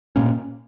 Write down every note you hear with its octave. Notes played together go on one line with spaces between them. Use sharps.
A#2 A#3 C#4